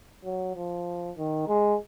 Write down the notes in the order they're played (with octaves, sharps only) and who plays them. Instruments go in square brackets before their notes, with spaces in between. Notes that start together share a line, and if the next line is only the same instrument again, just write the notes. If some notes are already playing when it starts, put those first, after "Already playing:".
[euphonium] F#3
F3
D#3
G#3